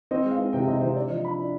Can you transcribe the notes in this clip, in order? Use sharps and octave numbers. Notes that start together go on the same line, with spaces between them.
C4 D#5
G#3
F5
C4
C3 G5
C3 D#5
C3 C5
D4 D5
D5
F3 D#5
D4 B5
D4